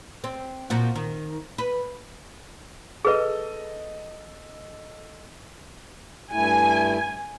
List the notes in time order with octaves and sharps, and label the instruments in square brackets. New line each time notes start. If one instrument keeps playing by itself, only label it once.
[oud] C4
A#2 F3 F#4
D#3
B4
[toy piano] G#4 B4 [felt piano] A4 D#5
[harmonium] G2 A3 E4 [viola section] G#5